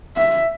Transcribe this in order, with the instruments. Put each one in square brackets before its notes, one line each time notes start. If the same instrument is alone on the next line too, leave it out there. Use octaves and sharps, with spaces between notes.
[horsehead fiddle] E5